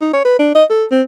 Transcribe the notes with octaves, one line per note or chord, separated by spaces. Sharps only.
D#4
C#5
B4
D4
D#5
A4
C4